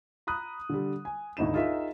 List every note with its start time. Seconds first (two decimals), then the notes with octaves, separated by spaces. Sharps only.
0.27 A#5 B5 D#6 F#6
0.69 D3 G3
1.05 G#5
1.37 G#1 D2 D#4 E4 E7
1.54 D#4 F4 G#4 A#4 E5